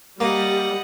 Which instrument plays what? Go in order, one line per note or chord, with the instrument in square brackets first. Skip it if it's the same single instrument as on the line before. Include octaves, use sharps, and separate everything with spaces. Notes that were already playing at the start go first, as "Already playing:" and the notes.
[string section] G3 [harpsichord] A#3 [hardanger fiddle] D#5 F#5